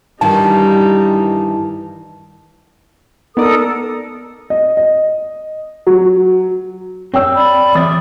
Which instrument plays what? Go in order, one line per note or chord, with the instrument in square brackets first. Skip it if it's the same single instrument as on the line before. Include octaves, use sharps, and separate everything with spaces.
[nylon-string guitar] G2 D#3 E3 [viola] G3 D#4 [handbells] A5
[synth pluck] B3 D#4 D5 [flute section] A4 A#4 D#6
[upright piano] D#5
D#5
F#3
[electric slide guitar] C4 [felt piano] C#5 G5 E6
[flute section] D5 B5
[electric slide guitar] E3 D5 E5 [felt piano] D#6 A6